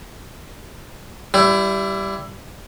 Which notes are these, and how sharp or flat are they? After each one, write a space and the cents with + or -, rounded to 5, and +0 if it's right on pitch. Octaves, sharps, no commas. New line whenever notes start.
G3 -10 E4 +20